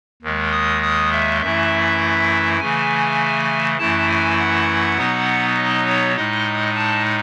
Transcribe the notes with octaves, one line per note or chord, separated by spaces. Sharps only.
D#2 D#3 G#3
D#6
D#6
E5
F#2 E3 A3 E4 E5
C#3 E3 A3 G#5
F#2 E3 A3 E4 A5
G#5
F#5
B2 F#3 B3 D#4
D#5
C#5
A2 G#3 D#4 D#5
A5